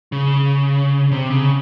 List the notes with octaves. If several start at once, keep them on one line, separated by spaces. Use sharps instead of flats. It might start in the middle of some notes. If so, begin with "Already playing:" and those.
C#3
C3
C#3